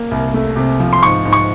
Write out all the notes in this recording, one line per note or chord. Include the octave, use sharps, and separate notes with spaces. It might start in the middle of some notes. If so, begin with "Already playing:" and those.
Already playing: A#3
C2
A3
C3
F3
C6
G#2 C#6
G#2
C#6